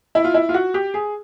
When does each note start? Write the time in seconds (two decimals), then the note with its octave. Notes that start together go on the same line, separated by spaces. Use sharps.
0.15 E4
0.24 F4
0.34 E4
0.49 F4
0.54 F#4
0.74 G4
0.94 G#4